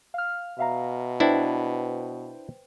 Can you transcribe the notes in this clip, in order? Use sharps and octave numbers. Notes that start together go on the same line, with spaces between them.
F5 F6
B2 E5 F5 A#5
D4 E4 B4 C5 G5